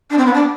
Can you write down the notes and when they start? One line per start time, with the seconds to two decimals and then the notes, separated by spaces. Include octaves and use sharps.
0.10 D4
0.18 C4
0.26 B3
0.34 D4